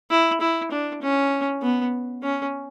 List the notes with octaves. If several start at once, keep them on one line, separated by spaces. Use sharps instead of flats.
E4
E4
D4
C#4
B3
C#4